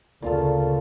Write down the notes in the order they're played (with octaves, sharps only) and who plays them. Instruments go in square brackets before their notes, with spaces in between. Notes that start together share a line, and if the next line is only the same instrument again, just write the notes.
[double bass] D2 C#3 [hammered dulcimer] A#2 F4 A4